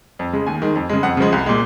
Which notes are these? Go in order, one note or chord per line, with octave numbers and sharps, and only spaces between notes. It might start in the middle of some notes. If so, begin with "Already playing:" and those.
F2
C#3 G#3
D#2 G#5
D#3 G#3
F2
C#3 G#3
F2 F#5
C#3 F3 G#3
C2
A#2 G#3